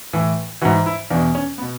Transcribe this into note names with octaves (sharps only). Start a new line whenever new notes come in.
A2 E3
G#2 E3 F#4
E4
E2 B2 D4
C#4
B3
B2